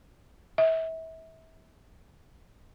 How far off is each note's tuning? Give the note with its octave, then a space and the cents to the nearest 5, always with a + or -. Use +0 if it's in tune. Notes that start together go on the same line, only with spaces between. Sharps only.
E5 -30